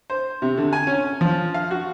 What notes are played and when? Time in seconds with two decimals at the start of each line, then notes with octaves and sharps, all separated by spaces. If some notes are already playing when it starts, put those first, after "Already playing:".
0.10 C5
0.42 C3
0.58 D3
0.73 G#5
0.87 C#4
1.21 F3
1.54 F5
1.71 F#4